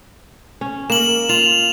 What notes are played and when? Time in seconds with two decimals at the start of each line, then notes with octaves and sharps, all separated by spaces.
0.61 C#4
0.90 A#3 E7 F#7
1.29 F4 F7